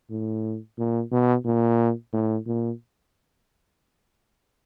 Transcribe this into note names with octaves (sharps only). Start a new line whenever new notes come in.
A2
A#2
B2
A#2
A2
A#2